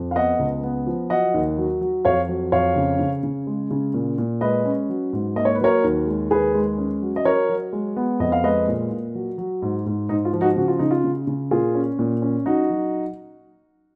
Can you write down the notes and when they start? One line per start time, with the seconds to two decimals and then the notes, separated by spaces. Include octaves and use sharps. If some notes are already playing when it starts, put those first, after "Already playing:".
Already playing: F2
0.11 F5
0.16 B3 D#5 F#5
0.39 C#2
0.63 B3
0.87 F3
1.10 F#3 D#5 F#5
1.34 D#2
1.58 F#3
1.81 F#3
2.05 F2 C#5 F5
2.28 F#3
2.52 F2 C#5 F5
2.76 C#3
2.99 C#3
3.23 C#3
3.47 G#3
3.71 C#3
3.94 A#2
4.18 A#2
4.41 G#3 B4 D#5
4.65 C#4
4.89 F#3
5.13 G#2
5.36 A#3 D#5
5.45 C#5
5.55 B4
5.60 F#3 A#4 C#5
5.84 D#2
6.07 G#3
6.31 D#2 G#4 B4
6.55 G#3
6.78 C#4
7.02 F#3
7.16 D#5
7.25 F#3 A#4 C#5
7.49 F#3
7.72 G#3
7.96 B3
8.20 F2 D#5
8.32 F5
8.43 G#3 B4 D#5
8.68 A#2
8.91 A#2
9.15 F#3
9.38 F#3
9.62 G#2
9.86 G#2
10.09 G#2 D#4
10.25 F4
10.33 F3
10.41 D#4 F#4
10.56 C#3 F#4
10.68 F4
10.79 C#3 D#4
10.91 F4
11.04 C#3
11.27 C#3
11.51 A#2 F4 G#4
11.75 C#4
11.99 A#2
12.22 C#4
12.46 F#3 D#4 F#4
12.70 F#3